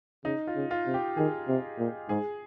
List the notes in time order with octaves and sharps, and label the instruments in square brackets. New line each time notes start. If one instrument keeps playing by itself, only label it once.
[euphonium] C#3 [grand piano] D#4
[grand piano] F4
[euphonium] C#3
[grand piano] F4
[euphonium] C3
[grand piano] G4
[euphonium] D#3 [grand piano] G#4
[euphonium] C3
A#2
[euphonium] G#2 [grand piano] G#4